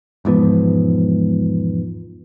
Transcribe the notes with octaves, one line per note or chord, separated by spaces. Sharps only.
E1 G#2 F3 B3